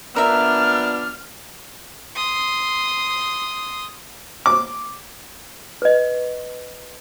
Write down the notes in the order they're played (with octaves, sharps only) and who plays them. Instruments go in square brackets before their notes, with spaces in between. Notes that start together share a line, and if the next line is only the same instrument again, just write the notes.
[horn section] F3 B3 D4 [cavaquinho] A#4 E5 [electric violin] F6
[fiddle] C6 D#6
[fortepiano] D6
[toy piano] B4 D#5